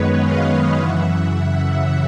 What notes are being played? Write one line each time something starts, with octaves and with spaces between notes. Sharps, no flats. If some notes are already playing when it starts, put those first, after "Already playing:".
Already playing: F#2 D#3 G#3 B3 B4 C#5
D#5 F5
F#2 C#3 E3 E5 F#5